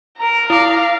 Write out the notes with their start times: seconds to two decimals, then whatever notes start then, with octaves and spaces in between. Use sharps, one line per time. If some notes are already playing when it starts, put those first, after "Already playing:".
0.17 A#4 A#5
0.50 E4 F5 D6